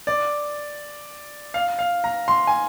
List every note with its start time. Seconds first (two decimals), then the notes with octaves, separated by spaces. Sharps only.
0.07 D5
1.54 F5
1.79 F5
2.04 A#5
2.28 C6
2.47 G#5